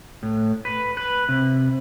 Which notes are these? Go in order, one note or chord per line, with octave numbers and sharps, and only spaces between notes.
A2
B4
B4
C3